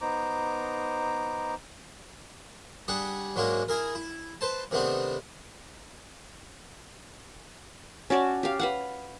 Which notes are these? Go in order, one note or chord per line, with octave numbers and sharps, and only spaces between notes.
B3 D#4 C5 A#5 D6
G3 D4 G#4 F#5
G#2 F#3 G#3 A#3 D4
E4 G#4 A#4
E4
B4 C5 A5
C3 D#3 A3 B3 C4 D4
C#4 F#4 D5 A5
G4 F5
B4 F5 F#5